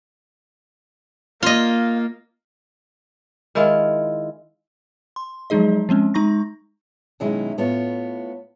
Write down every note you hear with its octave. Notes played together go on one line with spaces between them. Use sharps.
A#3 F4 D#5
D#3 G#3 E4 F4
C6
F3 F#3 G#3 D#4 G#4 D#5
F3 G#3 C4 C#4
G#3 D#4 A#5 C#6 A#6
B2 D#3 F#3 G#3 C#4 E4
A2 B3 F4 C#5